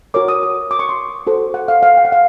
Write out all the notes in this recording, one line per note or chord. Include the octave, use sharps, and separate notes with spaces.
F#4 A#4 C#5 D6
D#6
D#6
D6
C#6
C6
F#4 A4 C5
F#5
F5
F5
G5
F#5
F5